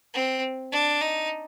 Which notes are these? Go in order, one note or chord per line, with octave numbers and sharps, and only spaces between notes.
C4
D4
D#4